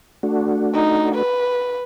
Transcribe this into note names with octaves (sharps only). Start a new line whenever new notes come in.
A3 D4 F#4
D#4
B4